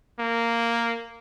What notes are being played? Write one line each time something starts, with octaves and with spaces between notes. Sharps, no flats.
A#3